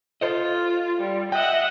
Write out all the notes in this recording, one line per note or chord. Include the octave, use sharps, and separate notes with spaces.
F4 A4 C5 D#5
G3
D#5 E5 F#5 G5